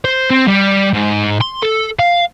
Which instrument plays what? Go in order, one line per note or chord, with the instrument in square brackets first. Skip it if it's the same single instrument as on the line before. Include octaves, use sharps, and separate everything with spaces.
[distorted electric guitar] C5
C4
G3
G#2
C6
A4
F5